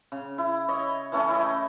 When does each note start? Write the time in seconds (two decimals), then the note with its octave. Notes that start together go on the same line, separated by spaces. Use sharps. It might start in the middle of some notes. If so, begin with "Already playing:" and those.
0.12 C#3
0.38 E4
0.68 C#5 D#5
1.12 E3 A3 C#4
1.29 E4 D#5